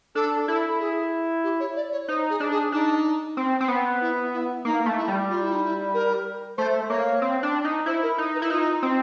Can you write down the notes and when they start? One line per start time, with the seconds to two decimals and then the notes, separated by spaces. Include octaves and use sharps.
0.15 D4 A4
0.48 E4 A4
0.80 G#4
1.44 G4
1.60 C#5
1.76 D5
1.92 C#5
2.08 D#4 C5
2.30 G#4
2.40 D4
2.51 G#4
2.72 D4 D#4
3.37 C4
3.60 C4
3.68 B3
4.01 E4
4.33 E4
4.65 A#3 D#4
4.86 A3
4.97 E4
5.08 G3
5.29 F4
5.41 E4
5.53 D#4
5.64 E4
5.94 A#4
6.57 A3 C5
6.89 A#3 C#5
7.22 C4
7.43 D4
7.64 D#4
7.86 E4 C5
8.02 A#4
8.18 D#4
8.34 B4
8.42 E4
8.50 D#4 F4
8.83 C4